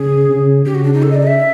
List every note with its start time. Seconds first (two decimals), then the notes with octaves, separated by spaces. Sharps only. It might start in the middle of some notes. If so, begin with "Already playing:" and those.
Already playing: C#3 G#4
0.29 C#3
0.66 C#3 G4
0.75 F#4
0.84 D4
0.93 D#4
1.03 A4
1.11 D#5
1.15 D5
1.23 D#5
1.27 E5